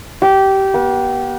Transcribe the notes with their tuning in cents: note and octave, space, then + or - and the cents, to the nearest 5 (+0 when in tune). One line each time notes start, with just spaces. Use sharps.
G4 -20
B3 -40